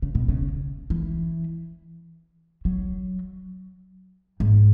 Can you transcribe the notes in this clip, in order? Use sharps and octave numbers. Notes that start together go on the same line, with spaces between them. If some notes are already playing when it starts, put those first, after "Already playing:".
C#3
B2
C#3
E3
F#3
G#2